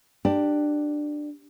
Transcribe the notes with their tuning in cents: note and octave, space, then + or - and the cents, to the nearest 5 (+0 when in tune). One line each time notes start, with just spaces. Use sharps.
D4 +15 G4 +0